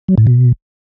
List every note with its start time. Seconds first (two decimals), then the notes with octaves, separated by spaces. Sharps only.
0.08 F#3
0.18 A2
0.27 B2